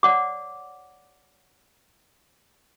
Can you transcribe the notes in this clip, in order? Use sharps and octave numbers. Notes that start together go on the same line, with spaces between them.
C#5 D5 F#5 D6